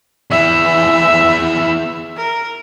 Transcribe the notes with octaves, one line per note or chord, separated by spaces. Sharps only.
E2 E3 E5
A#4